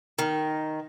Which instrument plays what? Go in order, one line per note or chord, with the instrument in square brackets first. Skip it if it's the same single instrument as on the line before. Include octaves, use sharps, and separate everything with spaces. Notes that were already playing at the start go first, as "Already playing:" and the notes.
[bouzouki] D#3